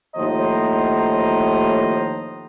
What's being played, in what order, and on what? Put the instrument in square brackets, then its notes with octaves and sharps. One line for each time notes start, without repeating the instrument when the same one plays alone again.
[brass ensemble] D#2 A2 F3 C5 D#5 A#5